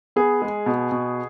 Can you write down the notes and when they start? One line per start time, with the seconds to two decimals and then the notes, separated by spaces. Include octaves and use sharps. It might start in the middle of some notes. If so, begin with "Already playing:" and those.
0.16 B3 G#4
0.42 G#3
0.66 B2
0.92 B2